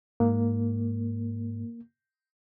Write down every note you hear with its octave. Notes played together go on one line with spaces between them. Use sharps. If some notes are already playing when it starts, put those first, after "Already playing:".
G#2 A#3